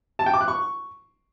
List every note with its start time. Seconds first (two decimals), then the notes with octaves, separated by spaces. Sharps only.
0.19 A5
0.26 G5
0.34 D6
0.41 F#6
0.48 C#6